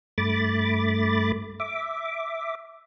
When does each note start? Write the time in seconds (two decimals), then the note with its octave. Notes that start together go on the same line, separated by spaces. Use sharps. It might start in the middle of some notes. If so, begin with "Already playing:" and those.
0.18 G2 A3 B5 D6 A6
1.60 E5 D6